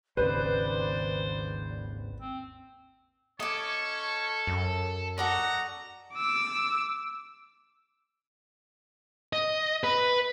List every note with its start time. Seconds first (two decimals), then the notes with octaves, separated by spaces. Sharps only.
0.17 G#1 D#2 C#3 B4 C5 D5
2.19 C4
3.40 C#4 A4 C#5 D#5 C#6 D6
4.47 F#2
5.18 F#4 A4 D5 D#5 F#5 A#5
6.14 D6 E6
9.33 D#5
9.84 B4